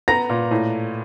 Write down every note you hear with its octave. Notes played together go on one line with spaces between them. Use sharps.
B3 A#5 A#6
A#2
A2